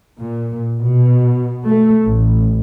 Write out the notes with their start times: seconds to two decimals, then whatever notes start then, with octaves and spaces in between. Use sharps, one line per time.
0.19 A#2
0.81 B2
1.68 A3
2.06 A1